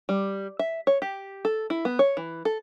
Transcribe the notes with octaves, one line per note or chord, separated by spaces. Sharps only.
G3
E5
C#5
G4
A4
E4
B3
C#5
E3
A4